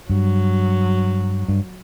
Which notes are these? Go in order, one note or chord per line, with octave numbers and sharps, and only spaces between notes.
G2 F#3
G2